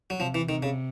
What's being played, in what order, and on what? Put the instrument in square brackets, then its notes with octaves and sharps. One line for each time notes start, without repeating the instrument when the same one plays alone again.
[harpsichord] F#3
[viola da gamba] C3 [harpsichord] F3
[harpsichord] E3
[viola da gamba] C3 [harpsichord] D#3
[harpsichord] C#3